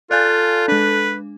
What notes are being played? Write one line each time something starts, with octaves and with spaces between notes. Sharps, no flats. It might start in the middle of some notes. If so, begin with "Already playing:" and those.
F4 A4 D5 F5 G#5 F#6 G6 A6
G#3 D4 B4